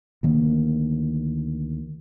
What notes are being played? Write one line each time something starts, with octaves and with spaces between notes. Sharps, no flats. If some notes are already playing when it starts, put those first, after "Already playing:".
D2 D#3 A#3